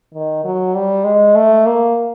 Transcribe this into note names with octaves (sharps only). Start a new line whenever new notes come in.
D#3
F#3
G3
G#3
A3
A#3